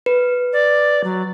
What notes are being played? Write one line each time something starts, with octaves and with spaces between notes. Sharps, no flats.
B4
D5
F#3